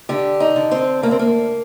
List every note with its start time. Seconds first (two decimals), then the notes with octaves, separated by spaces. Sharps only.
0.09 D3 G4
0.40 D#4
0.56 D3
0.71 C4
1.03 D2 A#3
1.11 C4
1.19 A#3